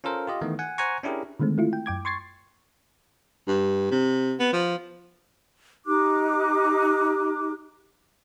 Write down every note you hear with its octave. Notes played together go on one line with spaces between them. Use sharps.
C#4 F4 A4 A#4 C5
F4 G4 D#5
D#3 E3 A3 B3
F#5 G#5
C5 F#5 G#5 A#5 C#6
C#4 D4 E4 G4 G#4 A#4
D3 D#3 G#3 A3 C4
A3 E4 F4
G5
F#2 G5 D6 G#6
C6 C#6 G#6 A6 C7
G2
C3
B3
F3
D#4 G4 D6 F#6